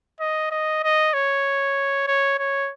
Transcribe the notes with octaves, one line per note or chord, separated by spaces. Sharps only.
D#5
D#5
D#5
C#5
C#5
C#5